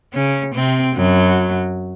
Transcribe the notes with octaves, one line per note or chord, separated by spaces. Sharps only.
C#3 C#4
C3 C4
F#2 F#3